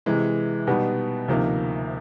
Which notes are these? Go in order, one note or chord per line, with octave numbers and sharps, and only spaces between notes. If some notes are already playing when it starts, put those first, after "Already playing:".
C3 E3 G#3
B2 G3 B3 D#4
D2 C3 F3 A#3 D#4